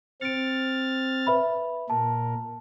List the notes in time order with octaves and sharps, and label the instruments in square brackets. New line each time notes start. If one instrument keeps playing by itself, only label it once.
[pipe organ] C4 F6 A6 [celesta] C#7 D7
[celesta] B4 E5 B5
[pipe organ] A#2 A#4 [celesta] A5